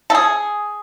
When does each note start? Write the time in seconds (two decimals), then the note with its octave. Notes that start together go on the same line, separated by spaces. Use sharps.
0.10 A4
0.15 G#4